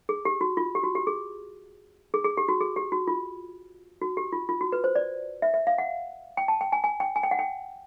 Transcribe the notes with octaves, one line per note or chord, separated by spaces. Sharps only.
G#4
G4
F#4
F4
G4
F#4
G4
G#4
G#4
G#4
G4
F#4
G#4
G4
F#4
F4
F#4
G4
F4
F4
F#4
B4
C5
D5
E5
E5
F5
F#5
G5
A5
G5
G#5
G#5
G5
G#5
G5
F#5
G5